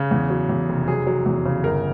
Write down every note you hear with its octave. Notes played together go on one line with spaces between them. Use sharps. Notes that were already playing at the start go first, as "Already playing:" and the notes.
Already playing: C#3
E2
F#3
E2
F1
F#3 G#4
F#3
E2
C#3
G1 A#4